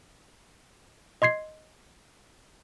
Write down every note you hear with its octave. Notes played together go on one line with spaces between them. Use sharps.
D#5 C6 G#6 C7